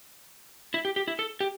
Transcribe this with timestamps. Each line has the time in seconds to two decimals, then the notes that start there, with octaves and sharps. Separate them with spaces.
0.74 E4
0.85 G4
0.96 G4
1.08 E4
1.19 A4
1.40 G4